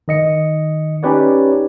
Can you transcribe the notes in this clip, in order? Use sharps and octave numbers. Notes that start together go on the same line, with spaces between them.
D#3 D#5 C#7
C#4 D#4 G4 B4 C#5 D5